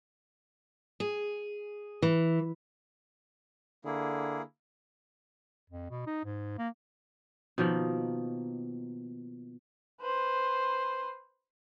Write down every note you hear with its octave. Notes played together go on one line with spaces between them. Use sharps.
G#4
E3
D3 A#3 E4 G#4
F2
B2
D#4
G#2
A#3
B2 D#3 F3 A#3
B4 C5